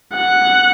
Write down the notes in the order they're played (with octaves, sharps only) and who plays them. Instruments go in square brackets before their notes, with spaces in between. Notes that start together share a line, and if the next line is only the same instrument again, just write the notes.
[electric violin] F#5